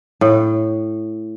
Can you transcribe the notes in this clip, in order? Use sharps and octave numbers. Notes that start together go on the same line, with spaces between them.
A2